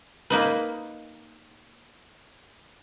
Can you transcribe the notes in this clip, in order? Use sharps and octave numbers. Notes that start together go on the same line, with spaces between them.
A#3 D#4 B4